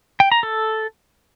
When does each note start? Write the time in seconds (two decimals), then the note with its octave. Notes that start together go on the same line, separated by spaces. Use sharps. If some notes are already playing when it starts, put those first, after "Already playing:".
0.20 G5
0.32 A#5
0.43 A4